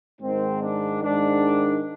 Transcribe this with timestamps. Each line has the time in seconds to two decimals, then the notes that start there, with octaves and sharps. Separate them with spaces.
0.21 G#2 D#3 C4
0.62 D4
1.03 G#2 D#3 D4